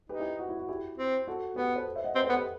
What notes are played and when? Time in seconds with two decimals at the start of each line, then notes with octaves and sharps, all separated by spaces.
0.09 D#4 G4 B4
0.20 E4 G4
0.39 F#4
0.49 E4
0.59 F#4
0.68 E4 G4
0.98 C4
1.28 F#4 A4
1.56 B3 G4 B4
1.76 A4 C5
1.95 C5 E5
2.04 D#5 F#5
2.15 C4 B4 D#5
2.24 A4 C5
2.29 B3
2.34 G4 B4